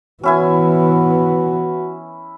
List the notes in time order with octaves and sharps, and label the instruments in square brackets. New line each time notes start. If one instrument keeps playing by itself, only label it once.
[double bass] E3 B3 [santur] C#4 E4 G#5 [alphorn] F#4